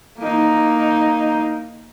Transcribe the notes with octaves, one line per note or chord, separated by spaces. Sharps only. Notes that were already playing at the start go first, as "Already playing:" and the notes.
A#3 D#4